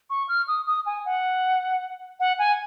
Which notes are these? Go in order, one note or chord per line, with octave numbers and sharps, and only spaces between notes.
C#6
F6
D#6
D#6
G#5
F#5
F#5
G#5